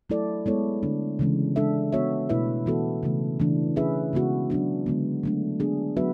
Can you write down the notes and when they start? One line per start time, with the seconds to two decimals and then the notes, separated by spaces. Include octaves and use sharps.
0.10 F#3 A3 E4 A4 D5
0.46 G#3 B3 E4 A4 C#5
0.83 D3 A3 D4
1.19 C#3 E3 G#3 C#4
1.56 C#3 G#3 D4 A4 E5
1.93 B3 F#4 C#5 E5
2.29 B2 A3 E4 B4 E5
2.66 E3 B3 F#4 A4
3.03 C#3 E3 A3
3.39 C#3 E3 A3 D4
3.76 C#4 E4 G#4 B4 E5
4.13 C#3 G#3 B3 F#4
4.50 F#3 B3 D4 F#4
4.86 D3 G#3 B3
5.23 F#3 A3 D4
5.59 G#3 B3 D4 G#4
5.97 F#3 B3 F#4 B4 E5